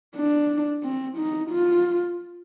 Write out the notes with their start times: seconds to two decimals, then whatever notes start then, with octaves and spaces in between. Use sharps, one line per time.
0.16 D4
0.83 C4
1.18 D#4
1.51 F4